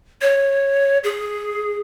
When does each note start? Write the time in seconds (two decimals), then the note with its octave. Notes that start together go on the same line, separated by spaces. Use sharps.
0.21 C#5
1.04 G#4